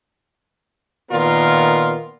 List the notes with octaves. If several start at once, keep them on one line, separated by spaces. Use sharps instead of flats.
A#2 D#3 B3 F4 A#4